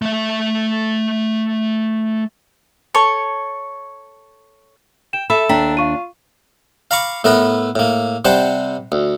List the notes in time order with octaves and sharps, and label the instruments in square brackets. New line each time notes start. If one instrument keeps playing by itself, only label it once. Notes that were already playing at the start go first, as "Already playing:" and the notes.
[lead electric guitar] A3 E5
[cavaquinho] A4 C#5 C#6
[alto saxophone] G5 [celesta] E7
[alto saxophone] A4 [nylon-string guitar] E5 [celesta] B5
[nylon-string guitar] D#2 D4 [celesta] G5 A#5 B6
[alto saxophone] F4 [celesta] F5 C#6 D#7
[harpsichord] F5 A#5 B5 C#6 D6
A2 A3 B3 A#4 B4
A2 A#3
C3 G3 C5 F#5 G5 A5
D2